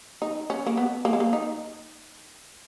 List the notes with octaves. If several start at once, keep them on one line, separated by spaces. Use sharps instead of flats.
D#4
C#4
A#3
B3
A#3
G#3
A#3
D#4